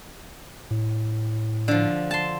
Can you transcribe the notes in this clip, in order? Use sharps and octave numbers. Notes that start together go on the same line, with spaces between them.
A2
D3 F3
A5 C6